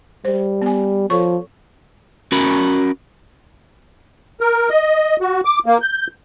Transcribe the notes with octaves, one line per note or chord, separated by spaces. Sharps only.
G3 C5
B3 G#5
F3 A4 C#5 C#6
C#4 F#4 A#4 B5
A#4
D#5
F#4
D6
A#3
G6